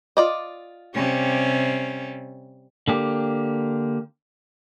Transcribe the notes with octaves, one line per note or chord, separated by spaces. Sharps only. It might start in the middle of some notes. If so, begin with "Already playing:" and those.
F4 D5 D#5
C3 G3 C#4
D3 A#3 G4